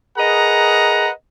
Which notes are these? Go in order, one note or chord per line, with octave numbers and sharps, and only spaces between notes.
G#4 A#4 B4 D#5 F#5 A#5